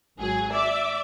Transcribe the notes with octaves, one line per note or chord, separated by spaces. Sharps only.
G#1 F#3 G#4 G#5
D5 E5 D6